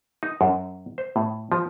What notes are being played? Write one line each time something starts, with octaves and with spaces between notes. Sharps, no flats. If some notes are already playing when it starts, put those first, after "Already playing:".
D#4
F#2
C5
A2
F3